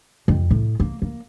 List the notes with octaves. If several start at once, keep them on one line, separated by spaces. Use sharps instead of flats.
F2
A2
A#3
A#3